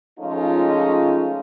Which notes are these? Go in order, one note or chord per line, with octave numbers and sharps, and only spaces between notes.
F3 G#3 A3 C#4 D#4 F4